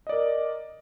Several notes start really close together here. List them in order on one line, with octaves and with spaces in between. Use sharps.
D#5 D5 A#4